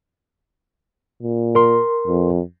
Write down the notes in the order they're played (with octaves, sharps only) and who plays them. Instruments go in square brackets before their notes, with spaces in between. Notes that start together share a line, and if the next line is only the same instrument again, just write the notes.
[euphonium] A#2
[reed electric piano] A#4 C6
[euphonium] F2